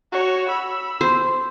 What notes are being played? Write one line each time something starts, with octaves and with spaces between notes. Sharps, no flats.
F#4 C#5
B5 E6
C5